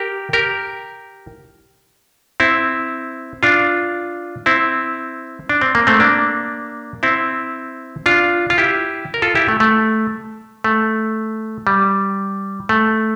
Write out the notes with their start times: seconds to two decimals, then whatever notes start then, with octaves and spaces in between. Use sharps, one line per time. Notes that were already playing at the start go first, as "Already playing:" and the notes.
Already playing: G4 A#4
0.33 G4 A#4
2.40 C4 E4
3.43 D4 F4
4.46 C4 E4
5.49 D4
5.61 C4
5.75 A#3
5.87 A3 C4
6.00 A#3 D4
7.03 C4 E4
8.06 D4 F4
8.50 F4
8.58 E4 G4
9.14 A#4
9.22 F4 A4
9.35 E4 G4
9.48 A3
9.60 A3
10.64 A3
11.67 G3
12.69 A3